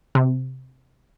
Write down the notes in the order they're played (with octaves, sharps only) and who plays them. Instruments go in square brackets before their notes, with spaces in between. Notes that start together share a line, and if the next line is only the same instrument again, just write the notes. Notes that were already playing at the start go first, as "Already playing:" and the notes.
[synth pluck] C3